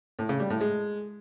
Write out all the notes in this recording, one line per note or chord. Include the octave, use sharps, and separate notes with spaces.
A2
C#3
G3
A2
G#3